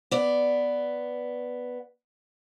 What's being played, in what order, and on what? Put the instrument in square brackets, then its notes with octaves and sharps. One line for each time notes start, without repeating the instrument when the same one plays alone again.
[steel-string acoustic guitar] B3 D5